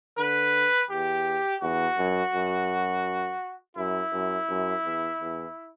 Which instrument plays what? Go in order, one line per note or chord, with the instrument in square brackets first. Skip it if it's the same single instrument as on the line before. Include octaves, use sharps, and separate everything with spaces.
[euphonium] D3 [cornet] B4
[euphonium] E2 [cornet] G4
[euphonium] E2 [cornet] F#4
[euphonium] F#2
F#2
[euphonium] F#2 [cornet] E4
[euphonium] F#2
F#2
E2
E2